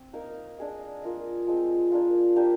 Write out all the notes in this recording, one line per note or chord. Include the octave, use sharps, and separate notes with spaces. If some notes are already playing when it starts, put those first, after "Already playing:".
Already playing: C4
A#3 D#4 A#4 F5
D4 G#4 D#5
A#3 F4 A#4 D#5
F3 G#3 C4
A#3 D4 F4
A#3 D4 G4 C5